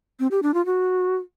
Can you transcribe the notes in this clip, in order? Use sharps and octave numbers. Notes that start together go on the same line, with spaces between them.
C4
G4
D4
F4
F#4